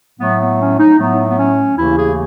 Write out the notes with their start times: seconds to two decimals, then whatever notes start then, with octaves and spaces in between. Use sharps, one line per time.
0.19 A2 F#3 A3 B3
0.40 B3
0.60 C#4
0.79 D#4
0.98 A2 F#3 A3 B3
1.28 B3
1.38 C#4
1.77 D#2 C#3 E3 A3 E4
1.97 G#4